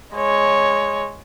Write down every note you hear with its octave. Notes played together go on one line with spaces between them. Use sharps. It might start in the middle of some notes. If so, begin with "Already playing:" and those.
G#3 C#5